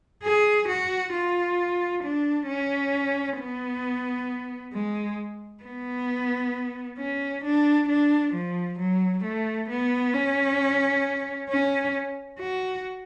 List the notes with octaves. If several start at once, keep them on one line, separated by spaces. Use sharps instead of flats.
G#4
F#4
F4
D4
C#4
B3
G#3
B3
C#4
D4
D4
F3
F#3
A3
B3
C#4
C#4
F#4